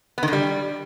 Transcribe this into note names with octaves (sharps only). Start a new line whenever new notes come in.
B3
D#3
D3
G3